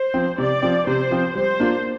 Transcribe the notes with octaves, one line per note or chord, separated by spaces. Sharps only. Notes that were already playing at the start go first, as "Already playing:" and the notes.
Already playing: C5
F3 C4
C3 D5
F3 C4
C3 C5
F3 C4
G3 C5
A#3 D4 F4